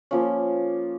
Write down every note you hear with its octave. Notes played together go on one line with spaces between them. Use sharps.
F3 A#3 C#4